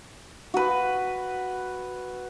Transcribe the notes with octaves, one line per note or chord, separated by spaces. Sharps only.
F#4 B4